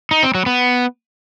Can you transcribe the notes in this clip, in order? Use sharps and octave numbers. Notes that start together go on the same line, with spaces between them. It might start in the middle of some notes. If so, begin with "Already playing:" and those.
D#4
C4
F#3
B3